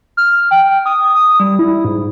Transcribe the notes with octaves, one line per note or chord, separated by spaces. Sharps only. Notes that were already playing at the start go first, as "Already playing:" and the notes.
F6
G5
D#6
D#6
G3
E4
G#2